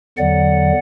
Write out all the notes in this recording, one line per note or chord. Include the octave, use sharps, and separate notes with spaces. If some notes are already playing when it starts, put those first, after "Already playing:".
E2 D3 F#3 D5 F#5